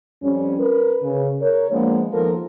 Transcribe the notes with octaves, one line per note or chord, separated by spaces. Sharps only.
F2 G3 C#4
A#4 B4
C#3
A#4 C#5
F3 G#3 A#3 B3 D4
D#2 F3 A4 A#4